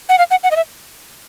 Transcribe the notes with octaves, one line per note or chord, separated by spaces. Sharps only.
F#5
F5
F#5
F#5
D#5
E5